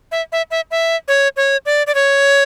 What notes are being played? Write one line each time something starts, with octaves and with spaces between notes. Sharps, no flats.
E5
E5
E5
E5
C#5
C#5
D5
D5
C#5